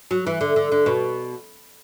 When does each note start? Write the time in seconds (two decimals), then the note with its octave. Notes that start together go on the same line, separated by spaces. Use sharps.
0.11 F#3
0.26 E3
0.41 D3
0.56 D3
0.72 D3
0.86 B2